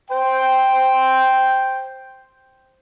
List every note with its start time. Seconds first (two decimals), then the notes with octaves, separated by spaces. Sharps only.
0.11 C5 G5